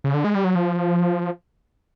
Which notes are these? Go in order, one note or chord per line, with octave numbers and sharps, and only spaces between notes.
C#3
D3
G#3
G3
F#3
F3